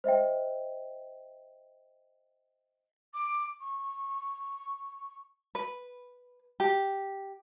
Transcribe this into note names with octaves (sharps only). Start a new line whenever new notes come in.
C5 D#5 E5 G5
D6
C#6
B4
G4